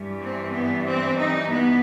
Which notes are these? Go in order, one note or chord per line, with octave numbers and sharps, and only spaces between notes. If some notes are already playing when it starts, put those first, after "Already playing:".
Already playing: G2 E3 G3
C4
B3
C4
D#4
B3